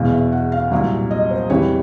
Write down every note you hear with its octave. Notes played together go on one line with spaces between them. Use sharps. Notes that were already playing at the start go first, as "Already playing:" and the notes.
Already playing: E2 B2 G#3 F5
E5
F#5
F5
C2 A#2 F#3 E5
D#5
C5
E2 C3 E3 G3 C#5